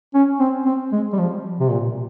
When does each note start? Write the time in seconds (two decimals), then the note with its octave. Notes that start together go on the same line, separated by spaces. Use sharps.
0.14 C#4
0.40 C4
0.66 C4
0.92 G#3
1.13 G3
1.18 F3
1.60 C3
1.70 A#2